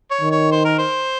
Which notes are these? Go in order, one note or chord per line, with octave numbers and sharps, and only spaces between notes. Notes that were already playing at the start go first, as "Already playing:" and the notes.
C#5
D#3
C#5
C5
A#4
C5